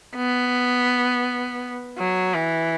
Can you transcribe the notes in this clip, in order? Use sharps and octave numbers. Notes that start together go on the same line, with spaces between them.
B3
F#3
E3